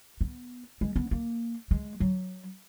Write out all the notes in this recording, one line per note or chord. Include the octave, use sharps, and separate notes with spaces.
B3
G#3
B3
A#3
G#3
F#3